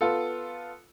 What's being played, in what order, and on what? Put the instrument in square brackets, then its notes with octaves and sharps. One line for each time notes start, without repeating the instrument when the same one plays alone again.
[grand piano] B3 F4 A4